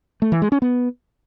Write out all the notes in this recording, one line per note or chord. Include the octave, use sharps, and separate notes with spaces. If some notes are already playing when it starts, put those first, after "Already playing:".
A3
E3
G#3
C#4
B3